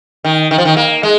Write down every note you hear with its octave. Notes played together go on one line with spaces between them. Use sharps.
D#3
D#3
F3
D#3
A#3
G#3